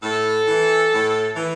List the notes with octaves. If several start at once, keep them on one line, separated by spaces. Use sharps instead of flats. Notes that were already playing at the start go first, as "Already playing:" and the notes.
A2 A4
E3
A2
E3